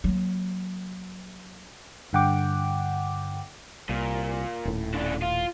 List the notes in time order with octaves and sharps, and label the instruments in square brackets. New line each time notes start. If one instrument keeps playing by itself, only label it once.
[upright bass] F#3 A#3
[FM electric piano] G2 D3 F#5 G5 D6
[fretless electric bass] C2 [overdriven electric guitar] A#2
[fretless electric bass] D#1 A2
[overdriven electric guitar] C#3 D4
F4